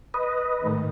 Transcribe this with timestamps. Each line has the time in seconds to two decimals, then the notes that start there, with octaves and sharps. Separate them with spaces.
0.14 B4 D#5
0.60 G#2 D#3 A3